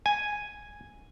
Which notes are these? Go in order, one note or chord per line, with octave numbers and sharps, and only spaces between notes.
G#5